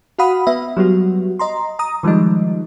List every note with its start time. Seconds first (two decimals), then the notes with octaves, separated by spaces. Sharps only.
0.19 F#4 F5 F#5 B5 D#6
0.47 B3 E5
0.77 F#3 G3 B3 F#4
1.39 D#5 A#5 C6
1.79 A#5 D#6
2.03 D#3 F3 G3 G#3 D#4